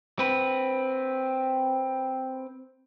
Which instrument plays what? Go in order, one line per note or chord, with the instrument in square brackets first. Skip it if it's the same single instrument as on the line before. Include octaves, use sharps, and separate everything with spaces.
[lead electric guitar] C4 B4